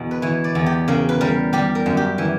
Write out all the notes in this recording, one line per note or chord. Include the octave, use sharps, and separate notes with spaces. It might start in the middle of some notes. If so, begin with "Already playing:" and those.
Already playing: E2 B2
B4
E3 C#5
D5
E2
G4
C#3 A#4
B4
G3 A#4
G3 G4
A#4
F#2
G4
E3